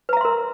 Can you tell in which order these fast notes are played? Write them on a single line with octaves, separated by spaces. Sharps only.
B4 A#5 E5 C6 A#4